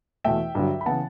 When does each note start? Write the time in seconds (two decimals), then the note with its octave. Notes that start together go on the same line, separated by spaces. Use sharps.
0.24 E2 B2 A3 E5 G5
0.55 G2 D3 F#3
0.81 B5
0.86 C#3 E3 B3 F#5 A5